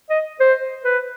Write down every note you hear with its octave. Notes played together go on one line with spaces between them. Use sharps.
D#5
C5
B4